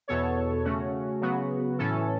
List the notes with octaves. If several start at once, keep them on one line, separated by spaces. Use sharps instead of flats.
E2 B2 B3 A4 C#5
C#3 A3 C#4 F#4
C#3 F#3 B3 F#4
A2 E3 C#4 A4